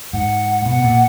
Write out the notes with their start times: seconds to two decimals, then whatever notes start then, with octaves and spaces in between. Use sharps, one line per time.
0.13 G#2 F#5
0.65 B2 F#5
0.84 A#2